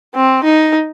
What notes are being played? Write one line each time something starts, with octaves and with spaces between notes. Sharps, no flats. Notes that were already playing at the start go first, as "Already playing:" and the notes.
C4
D#4